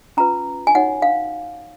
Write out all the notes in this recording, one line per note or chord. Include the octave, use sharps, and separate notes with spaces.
C#4 F4 B4 A#5
G#5
D#4 F#4 C#5 F#5
F5